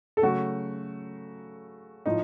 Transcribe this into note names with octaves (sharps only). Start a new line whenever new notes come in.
A4
C#3 F#3 A3 F#4
A2 F3 D#4